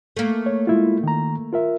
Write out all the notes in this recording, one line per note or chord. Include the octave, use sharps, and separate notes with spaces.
A3 A#3
C#5
G#3 E4 F4
D#3 A#5
F4 A#4 E5